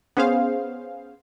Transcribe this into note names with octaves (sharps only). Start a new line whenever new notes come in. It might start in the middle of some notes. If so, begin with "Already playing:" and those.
B3 C#4 G#4 C5 F5